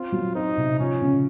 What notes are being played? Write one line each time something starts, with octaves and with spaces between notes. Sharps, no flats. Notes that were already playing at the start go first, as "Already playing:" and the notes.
Already playing: C4 F4
F#3
C4 D#4
C3
F3 C#4
C#3